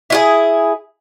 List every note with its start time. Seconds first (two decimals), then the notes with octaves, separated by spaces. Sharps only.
0.10 E4 F4 G#4